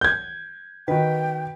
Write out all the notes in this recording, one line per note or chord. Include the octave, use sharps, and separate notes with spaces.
G6 G#6
D#3 F#4 B4 G5